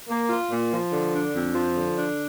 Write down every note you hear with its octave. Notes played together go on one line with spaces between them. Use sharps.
A#3
F4
A#2
F3
D3
D4
F2
F3
D3
D4